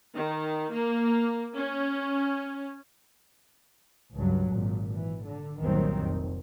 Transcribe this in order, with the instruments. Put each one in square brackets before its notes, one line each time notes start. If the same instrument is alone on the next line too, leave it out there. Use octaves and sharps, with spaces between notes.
[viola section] D#3
A#3
C#4
[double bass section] C#2 G2 F#3
G#1 A#2
E3
D3
G1 C2 A#2 D#3 F#3 C4
F1